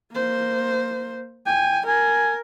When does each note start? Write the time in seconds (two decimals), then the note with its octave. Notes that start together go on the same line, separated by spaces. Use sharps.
0.13 A#3 C5
1.46 G5 G#5
1.87 A#4 G#5